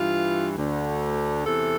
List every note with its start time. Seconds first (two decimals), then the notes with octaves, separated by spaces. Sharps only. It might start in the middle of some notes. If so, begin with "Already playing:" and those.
Already playing: G2 E3 F4
0.56 D2 D3
1.45 E2 C3 E3 A4